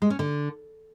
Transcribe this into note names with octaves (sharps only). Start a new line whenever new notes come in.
G#3
C#4
D3